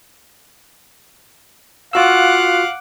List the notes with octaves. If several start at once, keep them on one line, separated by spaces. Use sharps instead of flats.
F4 F#4 F5 F#5 D6 E6 F#6